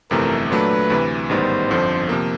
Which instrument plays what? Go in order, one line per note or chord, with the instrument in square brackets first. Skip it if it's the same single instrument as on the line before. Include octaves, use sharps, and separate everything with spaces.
[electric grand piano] G1 F2 C3 E3 A3 [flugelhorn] A#4
[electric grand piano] A#2 F#3 A3 D4 [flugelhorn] B4
[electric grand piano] D2 C3 E3
[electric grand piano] A1 G#2 D#3 G3 B3 [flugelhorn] C5
[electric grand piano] G1 F2 D3 F3
C3 F3 A#3